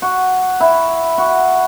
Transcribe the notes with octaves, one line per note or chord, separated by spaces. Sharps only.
F#4
E4
F#4